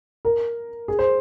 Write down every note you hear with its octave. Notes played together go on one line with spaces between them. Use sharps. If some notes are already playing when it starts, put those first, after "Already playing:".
A#4
G#4
C5